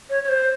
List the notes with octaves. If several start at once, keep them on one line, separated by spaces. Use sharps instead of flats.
C#5
C#5
C5